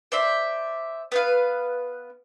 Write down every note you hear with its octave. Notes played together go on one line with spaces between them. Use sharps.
C5 D5 E5
B3 B4 F5